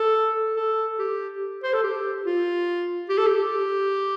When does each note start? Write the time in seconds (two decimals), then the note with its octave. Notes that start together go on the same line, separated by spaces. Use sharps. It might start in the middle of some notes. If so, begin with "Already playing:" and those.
Already playing: A4
0.56 A4
0.99 G4
1.63 C5
1.73 A4
1.83 G4
2.25 F4
3.09 G4
3.18 A4
3.27 G4